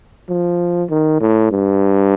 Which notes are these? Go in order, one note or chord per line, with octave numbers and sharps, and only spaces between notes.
F3
D#3
A2
G2